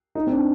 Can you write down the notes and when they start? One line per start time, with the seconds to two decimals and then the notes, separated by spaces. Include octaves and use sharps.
0.15 D#4
0.27 C4
0.32 D4